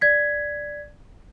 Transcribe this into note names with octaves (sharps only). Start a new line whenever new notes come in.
D5 G#6 B6